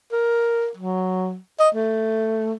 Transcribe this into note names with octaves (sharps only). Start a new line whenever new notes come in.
A#4
F#3
D#5
A3